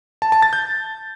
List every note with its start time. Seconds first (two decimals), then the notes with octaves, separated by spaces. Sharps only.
0.22 A5
0.32 A5
0.42 A6
0.53 G6